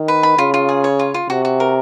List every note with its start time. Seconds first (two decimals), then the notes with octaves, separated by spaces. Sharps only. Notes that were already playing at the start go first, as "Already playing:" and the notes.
Already playing: D#3
0.08 B4
0.23 B5
0.38 C#3 F4
0.54 F4
0.69 G#4
0.84 C#5
0.99 F4
1.14 F4
1.29 C3 F#4
1.45 F#4
1.60 A#4